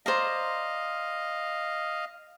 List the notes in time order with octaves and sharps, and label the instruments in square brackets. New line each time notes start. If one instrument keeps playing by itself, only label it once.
[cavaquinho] C5 D5 A#5 [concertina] D#5 F5